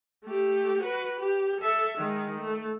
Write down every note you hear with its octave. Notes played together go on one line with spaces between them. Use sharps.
A3 G4
F#4 B4
G4
A4 E5
D#3 G#3
A3